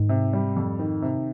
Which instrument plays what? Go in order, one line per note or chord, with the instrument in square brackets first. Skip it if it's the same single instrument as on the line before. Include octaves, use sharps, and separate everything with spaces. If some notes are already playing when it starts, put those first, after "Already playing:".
Already playing: [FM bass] G#2 [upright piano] D#3
[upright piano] C3
G3
F2
D#3
C3